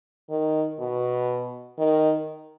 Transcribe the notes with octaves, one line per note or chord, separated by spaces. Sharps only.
D#3
B2
D#3